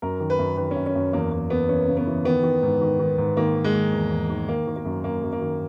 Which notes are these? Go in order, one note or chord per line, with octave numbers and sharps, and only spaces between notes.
F#2 A#4
D#3
B4
F#2
D#3 B4
C#4
F#2
C#4
F#2
E2 A#3
E2 A#3
E2 B3
E3 C#4
C#3
B3
E3
D#3 B3
D#3
G#2
D#3
D#3
G#2
D#3 A#3
D#3
G#3
D#3
E2
E2
D#3
D#3 A#3
D#3
A#3
F#2
F#2 A#3
F#2
A#3
D#3